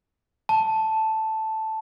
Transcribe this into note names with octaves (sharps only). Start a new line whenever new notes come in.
A5